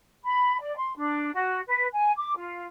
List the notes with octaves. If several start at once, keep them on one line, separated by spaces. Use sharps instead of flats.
B5
D5
C6
D4
F#4
B4
G#5
D6
F4